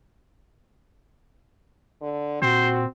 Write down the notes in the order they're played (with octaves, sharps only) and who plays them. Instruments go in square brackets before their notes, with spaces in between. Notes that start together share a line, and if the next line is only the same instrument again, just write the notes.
[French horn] D3
[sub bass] A#2 [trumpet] C4 [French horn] F#4 [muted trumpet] C5